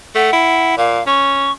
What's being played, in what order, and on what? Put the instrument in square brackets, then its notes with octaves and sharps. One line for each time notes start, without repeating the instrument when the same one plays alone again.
[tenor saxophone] A3 [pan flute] F#5
[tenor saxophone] E4
[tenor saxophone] A#2 [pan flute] F5
[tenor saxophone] C#4 [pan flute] C#6